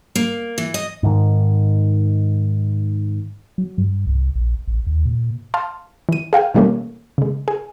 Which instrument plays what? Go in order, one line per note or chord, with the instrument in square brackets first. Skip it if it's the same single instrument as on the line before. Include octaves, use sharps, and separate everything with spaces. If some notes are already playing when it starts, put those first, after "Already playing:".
[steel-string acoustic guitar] A#3
E3
D#5
[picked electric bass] G#2 D#3
[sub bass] F#3
G2
C2
A#1
A1
D#2
A#2
[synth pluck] F5 A5 C6
E3 D#7
G#4 F5 G5 G#5
B2 E3 G3 A3 A#3 C#4
C#3 G#3
G#4